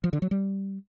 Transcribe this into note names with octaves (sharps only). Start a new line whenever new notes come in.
F3
D3
F#3
G3